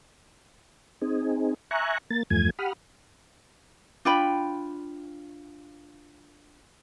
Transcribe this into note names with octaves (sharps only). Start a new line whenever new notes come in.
C4 D#4 G#4
E5 G#5 A#5 C#6 F#6
A#3 A6
E2 G2 F3 A3 G#5 G#6
G4 F#5 B5 D#6 F6
D4 F4 G5 B5